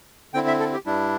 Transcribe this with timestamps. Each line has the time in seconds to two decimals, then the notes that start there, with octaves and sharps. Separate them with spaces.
0.34 D3 C4 E4 G5
0.48 E5
0.60 A4
0.73 G4
0.86 G2 G3 D4 E4